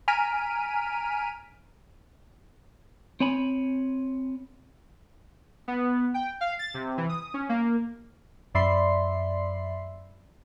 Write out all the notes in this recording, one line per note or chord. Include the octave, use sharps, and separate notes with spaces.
G#5 A#5 F6 B6 D7 D#7
C4 C#5 G#5 B5
B3
G5
F5
A6
C3
E3
D#6
C#4
A#3
F#2 D5 E5 B5 C6 C7